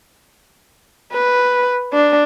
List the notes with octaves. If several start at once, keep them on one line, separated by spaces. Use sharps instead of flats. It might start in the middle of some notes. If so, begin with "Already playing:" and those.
B4
D4